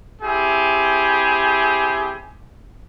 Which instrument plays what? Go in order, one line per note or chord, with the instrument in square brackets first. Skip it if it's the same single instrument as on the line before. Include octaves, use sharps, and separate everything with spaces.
[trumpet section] C4 E4 G4 G#4